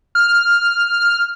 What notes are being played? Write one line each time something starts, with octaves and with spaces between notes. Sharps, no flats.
F6